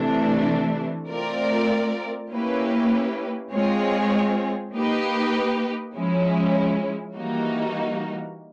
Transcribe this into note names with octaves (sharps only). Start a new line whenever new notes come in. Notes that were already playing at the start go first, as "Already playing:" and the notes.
Already playing: C3 E3 A3 D4
A3 C4 F4 A#4 D5
A#3 C#4 E4 G4 B4
G#3 C4 F4 G#4 C#5
A#3 D#4 G4 B4
F3 G#3 C#4 E4
E3 G3 A#3 D#4 F#4